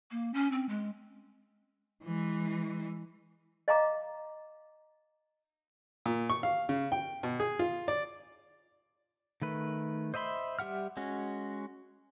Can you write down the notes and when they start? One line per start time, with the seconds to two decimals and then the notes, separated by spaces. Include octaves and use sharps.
0.11 A#3
0.34 C#4
0.52 C4
0.69 G#3
2.03 E3 G#3
3.68 D#5 F5 A#5 D6
6.06 A#2
6.30 C#6
6.43 F5
6.69 C#3
6.92 G5
7.23 B2
7.40 G#4
7.59 F4
7.88 D5
9.42 D#3 A3 B4
10.14 C5 D#5 E5 B5 C6
10.59 G3 G4 E5 F#5 F6
10.97 G#3 C#4 F#4